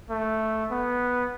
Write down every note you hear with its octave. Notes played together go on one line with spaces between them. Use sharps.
A3
B3